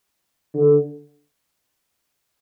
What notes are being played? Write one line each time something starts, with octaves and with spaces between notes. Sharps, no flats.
D3